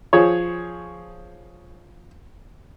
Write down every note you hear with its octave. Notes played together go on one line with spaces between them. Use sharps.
F3 G#4 C#5